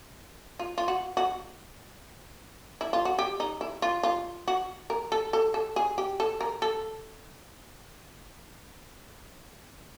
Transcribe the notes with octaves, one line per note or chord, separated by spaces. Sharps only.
F4
F4
F#4
F#4
E4
F4
F#4
G4
D#4
E4
F4
F4
F#4
A#4
A4
A4
A4
G#4
G4
A4
A#4
A4